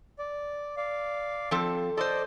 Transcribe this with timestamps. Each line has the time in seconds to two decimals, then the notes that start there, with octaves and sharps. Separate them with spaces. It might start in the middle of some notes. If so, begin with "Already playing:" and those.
0.19 D5
0.77 D5 F5
1.51 F3 C4 A4
1.97 A4 C5 D5 D#5 D6